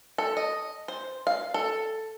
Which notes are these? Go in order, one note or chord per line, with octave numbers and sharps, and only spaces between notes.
A4
D#5
C5
F5
A4